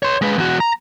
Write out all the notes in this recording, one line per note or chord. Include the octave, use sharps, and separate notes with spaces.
C#5 C6
G#3 B4
E2 F#4
A#5